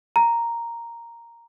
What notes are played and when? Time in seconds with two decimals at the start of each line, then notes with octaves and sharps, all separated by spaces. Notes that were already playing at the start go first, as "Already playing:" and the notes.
0.16 A#5